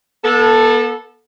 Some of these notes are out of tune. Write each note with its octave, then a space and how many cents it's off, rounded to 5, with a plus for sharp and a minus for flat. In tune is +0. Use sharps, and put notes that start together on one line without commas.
B3 -40 A4 +0